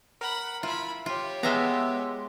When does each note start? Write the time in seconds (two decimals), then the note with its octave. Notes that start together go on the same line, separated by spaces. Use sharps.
0.21 A#4 F#5 B5
0.63 E4 F4 B5
1.06 F4 G4 C#5
1.43 G#3 B3 E5 F5 A#5